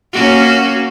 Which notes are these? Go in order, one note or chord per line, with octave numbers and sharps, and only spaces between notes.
A#3 C#4 F#4